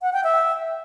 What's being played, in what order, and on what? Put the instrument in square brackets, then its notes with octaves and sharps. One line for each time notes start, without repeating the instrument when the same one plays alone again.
[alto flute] F#5
G5
E5